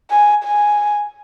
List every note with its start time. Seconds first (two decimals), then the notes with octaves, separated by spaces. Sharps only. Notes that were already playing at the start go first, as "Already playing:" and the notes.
0.11 G#5
0.44 G#5